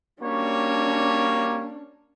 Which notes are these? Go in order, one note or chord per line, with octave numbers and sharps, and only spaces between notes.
G3 A#3 C#4 D4 F#4 C#5